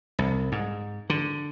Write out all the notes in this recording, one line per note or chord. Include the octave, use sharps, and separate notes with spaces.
C2
G#2
D3